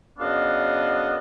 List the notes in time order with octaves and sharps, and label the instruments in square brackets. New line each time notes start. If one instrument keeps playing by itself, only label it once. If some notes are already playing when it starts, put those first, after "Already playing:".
[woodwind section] F#2 C#3 B3 D4 D#5 F5